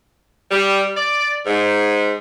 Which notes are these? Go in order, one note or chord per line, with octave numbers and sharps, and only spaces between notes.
G3
D5
G#2